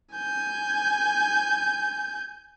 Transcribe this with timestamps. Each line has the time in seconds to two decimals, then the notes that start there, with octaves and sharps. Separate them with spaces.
0.15 G#5 G6